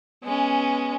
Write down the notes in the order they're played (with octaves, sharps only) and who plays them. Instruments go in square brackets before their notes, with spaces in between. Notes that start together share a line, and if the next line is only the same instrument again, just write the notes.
[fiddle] G#3 C#4 [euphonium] B3